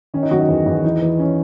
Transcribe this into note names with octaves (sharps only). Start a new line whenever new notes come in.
D#3 C#4
D#4
D#3 F#3 F#4
D#4
E2
E2
E3 D#4
E3
C#4